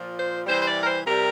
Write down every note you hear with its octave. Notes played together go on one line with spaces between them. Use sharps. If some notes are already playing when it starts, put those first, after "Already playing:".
Already playing: A#2 F3
C5
C3 E3 G3 C5
C5
D5
A#4
C5
C3 G3 A#4